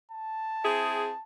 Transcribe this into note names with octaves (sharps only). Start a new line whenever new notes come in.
A5
C4 E4 G#4